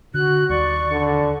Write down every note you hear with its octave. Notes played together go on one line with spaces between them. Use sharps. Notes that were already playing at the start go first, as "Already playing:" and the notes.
D3 F#4 F#6
D#2 G3 D5 C#6
D3